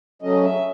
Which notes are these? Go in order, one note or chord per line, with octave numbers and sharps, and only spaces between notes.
C#3 F#3 A3 C#4 D#5
E5